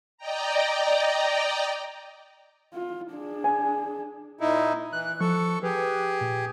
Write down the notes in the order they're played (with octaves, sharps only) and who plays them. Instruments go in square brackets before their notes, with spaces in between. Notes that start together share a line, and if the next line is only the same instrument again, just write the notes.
[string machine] D5 D#5 G5 A#5
[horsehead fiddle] F4
D4 G#4
[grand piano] G#5
[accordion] A#2 D#4 E4
[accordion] E3 [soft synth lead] F#6
[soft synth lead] F3 [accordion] A4 C#6
[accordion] G4 G#4 [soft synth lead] B4
[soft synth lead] A#2